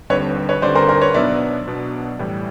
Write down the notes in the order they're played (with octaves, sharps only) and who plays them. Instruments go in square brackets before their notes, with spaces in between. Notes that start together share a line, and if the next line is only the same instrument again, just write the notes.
[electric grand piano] D#2 D3 G3 C4 [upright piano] B4 C#5
[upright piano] B4 C#5
[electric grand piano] D#2 D3 G3 C4 [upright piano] C5 D5
[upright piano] A#4 C5
A#4 C5
B4 C#5
[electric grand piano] B2 F#3 B3 D4 [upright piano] D5 E5
[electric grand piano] B2 F#3 B3 D4
A2 E3 G3